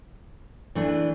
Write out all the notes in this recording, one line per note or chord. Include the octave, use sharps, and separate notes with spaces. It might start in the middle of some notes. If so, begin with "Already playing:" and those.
E3 A3 D4